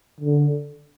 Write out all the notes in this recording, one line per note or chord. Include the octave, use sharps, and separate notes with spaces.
D3